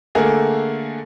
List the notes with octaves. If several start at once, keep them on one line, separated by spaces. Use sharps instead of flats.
D3 A3 A#3 G#4 A#4